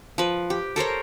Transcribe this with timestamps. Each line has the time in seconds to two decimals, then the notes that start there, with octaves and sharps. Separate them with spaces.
0.18 F3 B4
0.50 G4
0.76 A4 A#4 C5 C#5